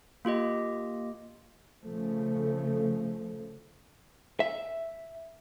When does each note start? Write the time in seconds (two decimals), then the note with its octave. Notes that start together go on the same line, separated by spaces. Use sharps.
0.25 A#3 F4 G4 D#5
1.84 C#3 F3 A3
4.40 E5